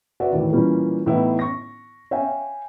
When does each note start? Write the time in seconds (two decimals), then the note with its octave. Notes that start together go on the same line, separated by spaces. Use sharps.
0.20 F#4 B4 D5 E5
0.32 D#2 A2 E3
0.52 A#2 E3 G3 C#4
1.06 A2 E3 B3 D#4 E4
1.39 C#6 A#6
2.11 C#5 E5 F5 G5 G#5